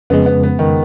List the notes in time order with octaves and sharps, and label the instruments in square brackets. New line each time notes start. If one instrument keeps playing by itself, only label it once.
[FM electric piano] F2 C#3 G#3 [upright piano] B3
[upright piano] B3
B3
D#3